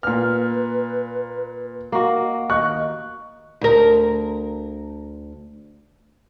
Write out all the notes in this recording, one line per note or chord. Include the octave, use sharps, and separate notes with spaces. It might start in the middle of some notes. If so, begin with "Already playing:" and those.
A#2 B4 F6
A#3 F#4 D#5
D#3 D#5 C#6 F#6
D2 A#4